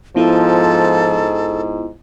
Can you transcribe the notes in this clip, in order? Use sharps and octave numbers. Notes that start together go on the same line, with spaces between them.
G#2 F3 B3 E4 F4 A4